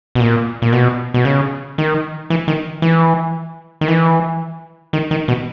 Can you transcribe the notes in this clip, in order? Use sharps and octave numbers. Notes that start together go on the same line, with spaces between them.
B2
A#2
A#2
B2
B2
C#3
D#3
E3
D#3
E3
D#3
E3
D#3
D#3
B2